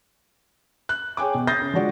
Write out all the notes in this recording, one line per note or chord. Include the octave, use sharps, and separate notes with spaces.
F#6
G#4 C#5 G5 G#5 D6
B2
D#6 G6 A6 A#6 C7
C#3
F3 G#3 D4 F#4 D5